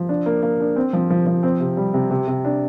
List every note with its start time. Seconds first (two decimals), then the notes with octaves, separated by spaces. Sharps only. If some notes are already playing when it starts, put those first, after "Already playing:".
Already playing: F3
0.09 D4
0.26 A#3
0.42 A#3
0.60 D4
0.76 C4
0.93 F3
1.10 F3
1.27 F3
1.43 C4
1.60 C3
1.77 G3
1.94 C3
2.11 C3
2.28 C3
2.45 D4